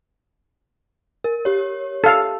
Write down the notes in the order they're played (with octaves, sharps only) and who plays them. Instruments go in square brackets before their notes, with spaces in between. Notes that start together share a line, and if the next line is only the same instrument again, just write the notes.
[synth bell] A#4
G4 C#5
[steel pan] A4 F5